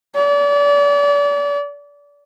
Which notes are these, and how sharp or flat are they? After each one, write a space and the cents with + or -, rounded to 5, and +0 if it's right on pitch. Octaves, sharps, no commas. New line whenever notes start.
D5 -35